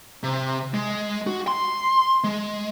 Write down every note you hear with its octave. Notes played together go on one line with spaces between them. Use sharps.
C3
G#3
F#4
C6
G#3